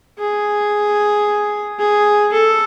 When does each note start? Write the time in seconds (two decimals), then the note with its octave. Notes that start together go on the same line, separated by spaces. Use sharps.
0.19 G#4
1.79 G#4
2.32 A4